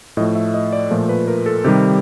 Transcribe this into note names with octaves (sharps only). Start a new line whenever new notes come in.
A2 F3 A3 D#5
E5
D#5
D5
A#2 F3 A3
B4
A#4
A4
C3 D#3 G3 G4